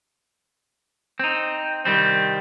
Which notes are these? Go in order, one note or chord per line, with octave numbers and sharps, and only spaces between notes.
C4 D#4
C2 D#3 G3 C4